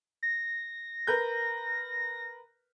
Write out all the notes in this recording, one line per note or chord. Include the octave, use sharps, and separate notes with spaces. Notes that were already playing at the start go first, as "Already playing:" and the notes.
A#6
A#4 B4 G6